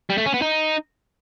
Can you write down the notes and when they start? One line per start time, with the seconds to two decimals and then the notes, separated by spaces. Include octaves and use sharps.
0.10 G3
0.18 A3
0.26 C#4
0.34 B3
0.42 D#4